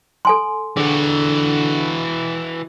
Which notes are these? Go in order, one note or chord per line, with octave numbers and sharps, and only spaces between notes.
A4 G#5 C6
D3 E3 F#4 G#4